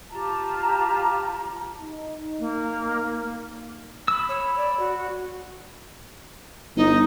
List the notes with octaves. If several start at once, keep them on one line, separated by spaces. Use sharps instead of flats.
F4 G4 A5 A#5
D#4
A#3
B5 E6
C#5
D5
F#4
G1 D#4